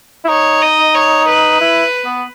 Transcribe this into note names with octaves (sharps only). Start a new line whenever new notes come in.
E4
D#4 C#5
D#5
C#5
B4
E4
B3